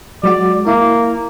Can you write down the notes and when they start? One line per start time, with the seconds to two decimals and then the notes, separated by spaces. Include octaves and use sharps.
0.24 F#3 G#3 F#4 D5
0.67 A#3 E4